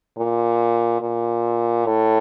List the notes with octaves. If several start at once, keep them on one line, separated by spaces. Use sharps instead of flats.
A#2
A#2
A2